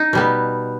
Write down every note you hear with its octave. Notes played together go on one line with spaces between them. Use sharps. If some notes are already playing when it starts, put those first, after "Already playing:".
Already playing: D#4
B2 G3 B3